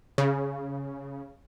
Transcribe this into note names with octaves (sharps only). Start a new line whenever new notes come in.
C#3